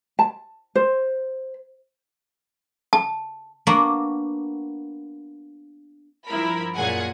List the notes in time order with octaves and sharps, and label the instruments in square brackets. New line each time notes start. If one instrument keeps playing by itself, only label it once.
[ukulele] A5
C5
[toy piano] A5
[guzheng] A#3 B3 D4 F#4
[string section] G2 F3 E4 A#4 B5
F#2 A#2 G#4 F#5 G#5 G#6